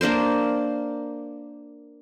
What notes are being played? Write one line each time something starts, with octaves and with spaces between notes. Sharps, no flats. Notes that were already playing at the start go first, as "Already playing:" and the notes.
A#3 D4 A#4 C5